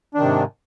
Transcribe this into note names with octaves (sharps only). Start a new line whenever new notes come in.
G#2 C3 D#3 D4